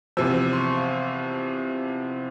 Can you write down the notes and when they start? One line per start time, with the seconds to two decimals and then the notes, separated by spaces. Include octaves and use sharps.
0.17 E2 C3 F3 E6
0.37 E6
0.53 C6
0.57 C#6
0.78 F5